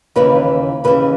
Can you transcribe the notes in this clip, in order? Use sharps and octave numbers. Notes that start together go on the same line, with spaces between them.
D#2 C#3 E3 B4
D#2 C#3 E3 B4